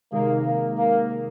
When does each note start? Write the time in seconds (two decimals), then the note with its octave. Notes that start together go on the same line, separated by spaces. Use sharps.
0.12 C3 D#3 G#3 A#3 D#4 G#4
0.44 A#3
0.76 A#3